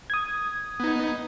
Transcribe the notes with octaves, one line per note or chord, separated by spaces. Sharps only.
D#6 G#6
B3 D#4